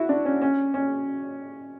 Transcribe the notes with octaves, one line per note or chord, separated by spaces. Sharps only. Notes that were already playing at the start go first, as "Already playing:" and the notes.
Already playing: E4 F#4
D4
C#4
C#4
C#4